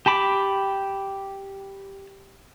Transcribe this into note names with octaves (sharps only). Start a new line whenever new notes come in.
G4 A5 B5 D6